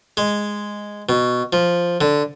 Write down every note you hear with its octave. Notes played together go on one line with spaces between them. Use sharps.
G#3
B2
F3
D3